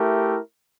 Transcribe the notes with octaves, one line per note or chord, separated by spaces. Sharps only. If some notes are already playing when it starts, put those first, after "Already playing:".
Already playing: A3 E4 G4 A#4